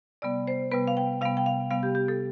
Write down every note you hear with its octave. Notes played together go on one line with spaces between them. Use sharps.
C3 G3 B3 D5
C5
C3 G3 B3 B4
F5
G5
C3 G3 B3 F5
G5
F5
C3 G3 B3 F5
G4
G4
A4